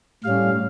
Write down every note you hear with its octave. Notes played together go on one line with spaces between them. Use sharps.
A2 G3 C#4 F5